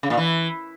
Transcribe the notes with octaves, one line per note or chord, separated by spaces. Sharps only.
C#3
A#2
E3